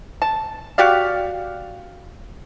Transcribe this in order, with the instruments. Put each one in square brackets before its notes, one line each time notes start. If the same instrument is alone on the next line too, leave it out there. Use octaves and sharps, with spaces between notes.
[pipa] A5
F#4 G4 D5 F5